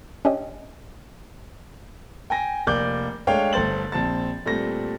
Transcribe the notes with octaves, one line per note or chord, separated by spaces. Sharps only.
C#4 D4 G4 D#5
G5 G#5 A#6
F1 A#3 D5 D6 G6
G#3 A3 D4 C#5 F5 G5
G1 A3 C5 A6 F#7
A#1 C4 A5 A6
A#2 G3 A3 C4 A#6